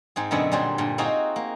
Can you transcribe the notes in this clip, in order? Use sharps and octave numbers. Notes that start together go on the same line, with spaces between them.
G#2 C4 G#4
F#2 B2 D3 B3 C4 G#4
A#2 F#3 G3 G#4 C5
G2 A#2
C4 D#4 F4 F#4 G#4 C5
A#3